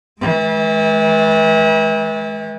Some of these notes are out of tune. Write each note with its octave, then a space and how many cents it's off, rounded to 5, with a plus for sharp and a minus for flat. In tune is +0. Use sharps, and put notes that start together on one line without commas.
E3 -35 G#3 +30